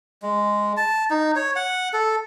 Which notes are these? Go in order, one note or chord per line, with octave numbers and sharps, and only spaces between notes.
G#3
A5
D#4
C#5
F#5
A4